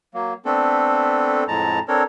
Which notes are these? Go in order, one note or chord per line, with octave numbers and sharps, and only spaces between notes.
F#3 A#3
A3 B3 C4 D4 A4
F2 A2 G#3 A5 A#5
C4 D4 A4 A#4 C#5